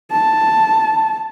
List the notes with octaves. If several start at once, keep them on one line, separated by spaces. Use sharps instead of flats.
A5